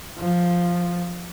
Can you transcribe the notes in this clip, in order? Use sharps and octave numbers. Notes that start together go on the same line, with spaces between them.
F3